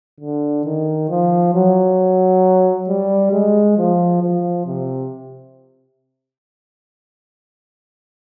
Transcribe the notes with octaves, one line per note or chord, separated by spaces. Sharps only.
D3
D#3
F3
F#3
G3
G#3
F3
F3
C3